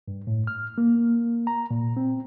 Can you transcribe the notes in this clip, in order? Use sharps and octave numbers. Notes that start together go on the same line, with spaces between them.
G2
A2
F6
A#3
A#5
A#2
C4